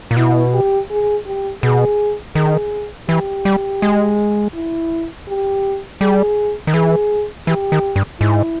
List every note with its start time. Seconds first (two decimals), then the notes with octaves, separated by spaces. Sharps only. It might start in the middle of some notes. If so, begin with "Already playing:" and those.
0.11 A#2
0.17 B2 E4
0.54 G4
0.90 G#4
1.26 G4
1.62 B2 G#4
2.35 D#3 G#4
3.09 E3 G4
3.45 G3
3.82 G#3
4.54 E4
5.28 G4
6.01 G3 G#4
6.67 D#3
6.74 E3 G#4
7.47 E3 G4
7.72 D#3
7.96 G2
8.20 G#2 E4